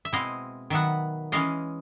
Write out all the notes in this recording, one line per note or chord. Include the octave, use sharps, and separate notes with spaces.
E5
B2 G#3 C4 E4 D#5 F5
D#3 F#3 B3 E5 F#5
E3 G#3 C#4 D#5 F5